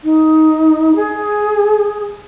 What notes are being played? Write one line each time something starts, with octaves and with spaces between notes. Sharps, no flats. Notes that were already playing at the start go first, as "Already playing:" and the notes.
D#4
G#4